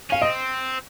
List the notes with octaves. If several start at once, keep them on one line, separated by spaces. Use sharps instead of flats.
C#4 F5
C4 D#5